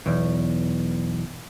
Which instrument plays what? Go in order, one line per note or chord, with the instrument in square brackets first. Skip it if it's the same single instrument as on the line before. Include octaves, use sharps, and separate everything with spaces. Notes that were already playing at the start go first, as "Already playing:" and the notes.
[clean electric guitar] B1 E2